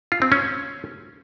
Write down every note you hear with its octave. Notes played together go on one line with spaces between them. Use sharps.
F4
C4
C#4